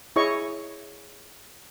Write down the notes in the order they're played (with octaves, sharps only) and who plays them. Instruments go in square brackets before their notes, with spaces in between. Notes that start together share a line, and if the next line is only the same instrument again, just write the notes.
[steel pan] E4 G#4 C#5 D#5 C#6